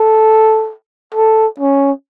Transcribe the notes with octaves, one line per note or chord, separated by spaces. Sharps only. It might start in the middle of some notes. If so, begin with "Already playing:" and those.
Already playing: A4
A4
C#4